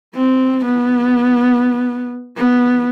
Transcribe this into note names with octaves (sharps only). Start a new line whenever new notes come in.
C4
B3
B3